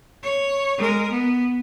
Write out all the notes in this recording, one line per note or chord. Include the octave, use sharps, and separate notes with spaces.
C#5
G#3 A#4
B3